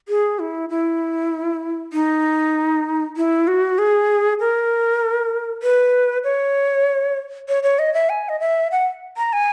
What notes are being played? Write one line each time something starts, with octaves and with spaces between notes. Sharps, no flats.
G#4
E4
E4
D#4
E4
F#4
G#4
A#4
B4
C#5
C#5
C#5
D#5
E5
G#5
D#5
E5
F#5
A#5
G#5